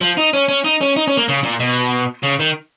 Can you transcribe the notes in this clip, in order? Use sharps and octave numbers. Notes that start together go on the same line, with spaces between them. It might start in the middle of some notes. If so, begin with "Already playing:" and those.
F3
D#4
C#4
C#4
D#4
C#4
D#4
C#4
A#3
C#3
A#2
B2
C#3
D#3